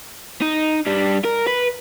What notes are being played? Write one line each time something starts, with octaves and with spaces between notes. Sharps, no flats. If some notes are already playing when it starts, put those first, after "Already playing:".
D#4
G2 G3
A#4
B4